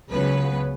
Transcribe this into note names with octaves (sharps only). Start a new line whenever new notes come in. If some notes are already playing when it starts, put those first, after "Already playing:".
C#2 C#3 F#3 B3 B4